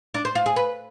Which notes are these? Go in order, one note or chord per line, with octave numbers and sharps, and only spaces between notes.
D4
C5
F4
G#4
B4